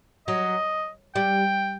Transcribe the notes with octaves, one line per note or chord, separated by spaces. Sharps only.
F#3 D#5
G3 G5